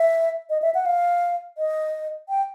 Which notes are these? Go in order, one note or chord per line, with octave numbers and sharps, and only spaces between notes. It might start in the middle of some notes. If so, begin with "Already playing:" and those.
Already playing: E5
D#5
E5
F#5
F5
D#5
G5